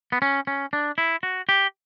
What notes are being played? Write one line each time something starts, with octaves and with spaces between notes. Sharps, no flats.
B3
C#4
C#4
D4
E4
F#4
G4